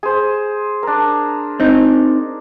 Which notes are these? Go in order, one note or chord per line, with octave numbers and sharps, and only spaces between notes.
G#4 C5
D4 A#4
C4 D#4